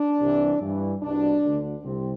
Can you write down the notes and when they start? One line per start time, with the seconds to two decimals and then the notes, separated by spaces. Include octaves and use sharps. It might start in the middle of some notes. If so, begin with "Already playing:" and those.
Already playing: D4
0.20 C2 C3 E3
0.61 G2 E3
1.02 C2 B2 D4
1.44 D2 D3
1.84 C2 C3 C4